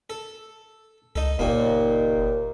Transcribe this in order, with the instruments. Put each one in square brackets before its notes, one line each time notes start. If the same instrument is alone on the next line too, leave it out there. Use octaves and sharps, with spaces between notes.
[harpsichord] A4
[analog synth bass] C#2 [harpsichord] D#4 A4
[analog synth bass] F#1 [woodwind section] D#2 [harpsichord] A#2 A#3